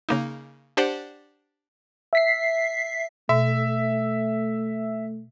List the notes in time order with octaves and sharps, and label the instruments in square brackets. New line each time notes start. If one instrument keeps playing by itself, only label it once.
[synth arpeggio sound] C#3 A#3 D#4
D4 G4 C5 D5 F#5
[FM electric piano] E5 B6 C7
[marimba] B2 [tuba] A3 [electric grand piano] E5